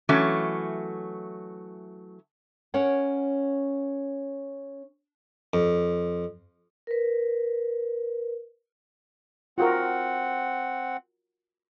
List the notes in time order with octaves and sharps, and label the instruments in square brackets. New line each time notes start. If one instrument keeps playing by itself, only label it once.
[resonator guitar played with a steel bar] E3 F#3 A3 C#4
[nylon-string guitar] C#4 A#4 C#5 F#5
[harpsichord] F2
[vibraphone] A#4 B4
[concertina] C4 F#5 [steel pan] F4 F#4 A#4